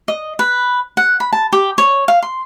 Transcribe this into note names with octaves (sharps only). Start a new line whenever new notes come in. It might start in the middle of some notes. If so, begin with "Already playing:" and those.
D#5
B4
F#5
B5
A5
G4
C#5
F5
C6